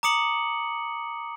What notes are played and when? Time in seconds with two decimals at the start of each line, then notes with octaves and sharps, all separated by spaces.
0.03 A#5 D6 D#6 C#7 F#7